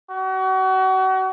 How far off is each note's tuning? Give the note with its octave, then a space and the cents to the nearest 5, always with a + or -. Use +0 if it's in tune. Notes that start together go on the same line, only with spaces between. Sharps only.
F#4 +35